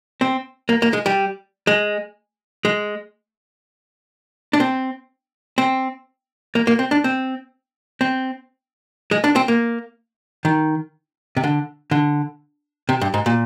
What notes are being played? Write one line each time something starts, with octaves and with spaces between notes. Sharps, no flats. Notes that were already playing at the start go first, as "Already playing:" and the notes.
C4
A#3
A#3
G#3
G3
G#3
G#3
D4
C4
C4
A#3
A#3
C4
D4
C4
C4
G#3
D4
C4
A#3
D#3
C3
D3
D3
C3
G2
G#2
A#2